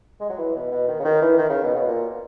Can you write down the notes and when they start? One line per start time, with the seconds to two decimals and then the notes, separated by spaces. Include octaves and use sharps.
0.20 G#3
0.30 F#3
0.38 E3
0.55 B2
0.71 B2
0.88 D#3
1.00 C#3
1.05 D#3
1.22 E3
1.38 D#3
1.50 C#3
1.63 B2
1.75 B2
1.87 A#2